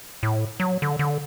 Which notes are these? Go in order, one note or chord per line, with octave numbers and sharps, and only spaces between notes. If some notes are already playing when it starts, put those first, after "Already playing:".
A2
F#3
D3
D3